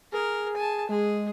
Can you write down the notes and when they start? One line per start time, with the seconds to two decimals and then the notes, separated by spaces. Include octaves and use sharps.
0.12 G#4 A#4
0.56 G#5 A5
0.89 G#3 G#4